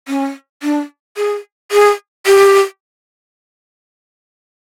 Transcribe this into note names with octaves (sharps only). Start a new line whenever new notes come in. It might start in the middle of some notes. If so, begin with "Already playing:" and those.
C#4
D4
G#4
G#4
G4